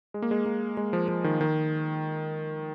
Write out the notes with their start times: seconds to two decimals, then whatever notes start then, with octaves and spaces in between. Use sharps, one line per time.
0.14 G#3
0.22 A#3
0.31 G#3
0.46 A#3
0.77 G#3
0.93 F3
1.08 F3
1.24 D#3
1.41 D#3